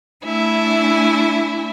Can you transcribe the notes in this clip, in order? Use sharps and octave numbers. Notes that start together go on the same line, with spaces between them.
A3 D4 E4 E5 G#5